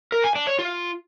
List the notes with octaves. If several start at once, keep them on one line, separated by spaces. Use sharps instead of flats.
A#4
G#5
D4
C#5
F4